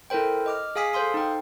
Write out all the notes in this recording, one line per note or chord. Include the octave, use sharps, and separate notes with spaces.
E4 A4 A#4 C5 G5
D#5 D6 F6
G#4 F5 G#5 D#6 B6
A4 C5 F5 C6 D#6
D#4 G5